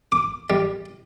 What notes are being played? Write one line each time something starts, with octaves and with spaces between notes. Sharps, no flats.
D6
G3